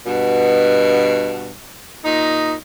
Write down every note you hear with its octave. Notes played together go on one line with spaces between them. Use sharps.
G2 B2
A#2 D#4